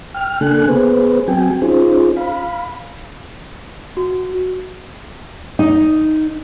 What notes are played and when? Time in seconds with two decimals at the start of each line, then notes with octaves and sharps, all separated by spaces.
0.14 G5 F6
0.41 C#3 A#3 D4 A4 G#5 F#6
0.67 B3 G#4 B4 C5
1.28 F#3 C4 F#4 G5 G#5
1.62 C#4 D#4 F4 G#4 C5
2.17 F5 B5
3.97 F#4
5.59 D#4